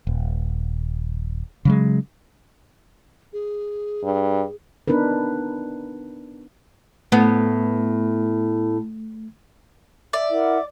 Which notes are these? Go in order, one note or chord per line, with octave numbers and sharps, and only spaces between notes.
D#1
C#3 F#3 G#3
G#4
G2
B3 D4 D#4 A#4 B4
A2 A3 B3
D5 E5
E4 A#4 F#5